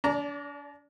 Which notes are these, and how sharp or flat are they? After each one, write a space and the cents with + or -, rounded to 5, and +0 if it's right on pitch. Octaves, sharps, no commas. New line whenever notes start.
D4 -40 D5 -10 A#5 -10